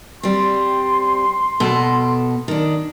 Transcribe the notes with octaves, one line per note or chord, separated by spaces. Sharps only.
G3 C4 C6
B2 A4
D#3 D4